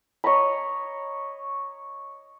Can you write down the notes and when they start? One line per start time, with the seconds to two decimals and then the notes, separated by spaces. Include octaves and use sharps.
0.24 C#5 D#5 A#5 B5